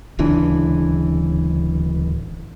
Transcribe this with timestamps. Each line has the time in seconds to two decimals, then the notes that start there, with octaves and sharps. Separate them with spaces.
0.19 D1 C#2 E3 D4